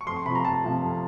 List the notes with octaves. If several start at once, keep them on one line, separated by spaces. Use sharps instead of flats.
C#6
F2 C6
C#6
C3 F3 B5
A#5
F2 A5
C3 F3
F2